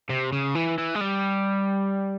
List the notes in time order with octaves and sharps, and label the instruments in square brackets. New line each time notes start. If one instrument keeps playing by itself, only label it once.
[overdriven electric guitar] C3
C#3
E3
E3
G#3
G3